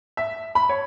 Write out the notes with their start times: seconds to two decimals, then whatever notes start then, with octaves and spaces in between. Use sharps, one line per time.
0.17 E5
0.55 B5
0.69 C#5